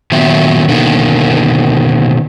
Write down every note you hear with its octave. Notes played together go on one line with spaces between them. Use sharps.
A#2 D#3 F#3 B3 E5
B2 D3 D#3 A#3